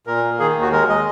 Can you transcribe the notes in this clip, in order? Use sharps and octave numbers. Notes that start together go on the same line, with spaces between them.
A#2 A#4
A#3
D#3 G#4
D#2
F#4
G#3 A#4
G#3 D#5